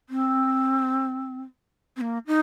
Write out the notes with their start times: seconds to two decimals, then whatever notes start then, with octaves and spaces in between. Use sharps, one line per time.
0.09 C4
1.97 C4
2.01 A#3
2.27 D#4